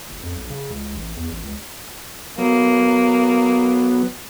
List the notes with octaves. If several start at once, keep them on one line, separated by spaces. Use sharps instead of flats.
F#1
F2
B1
C#3
C#2
A1
E2
A1
C#2
F#3 A#3 B3